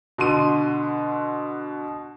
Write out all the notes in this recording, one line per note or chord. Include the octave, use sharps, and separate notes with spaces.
B2 D3 C6 D#7